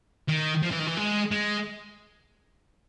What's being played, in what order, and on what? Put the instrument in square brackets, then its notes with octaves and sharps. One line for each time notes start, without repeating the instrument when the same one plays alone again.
[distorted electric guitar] D#3
F3
E3
D#3
E3
G#3
G#3